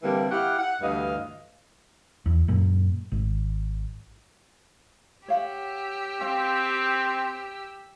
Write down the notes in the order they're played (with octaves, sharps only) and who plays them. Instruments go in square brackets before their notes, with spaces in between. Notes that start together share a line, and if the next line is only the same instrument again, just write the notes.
[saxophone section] D3 E3 G3 A#3 C4
E4 G4 F5 F#5
F#5
D2 G2 E3 D#5 F5
[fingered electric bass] E2
F#2 A#2
G#1
[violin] G4 E6 [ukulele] C#5 F5 F#5
[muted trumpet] C4 [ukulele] F5